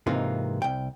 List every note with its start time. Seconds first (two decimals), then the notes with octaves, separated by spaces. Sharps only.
0.07 G#2 C3 E3 A#3 D#4 F4
0.62 C2 G5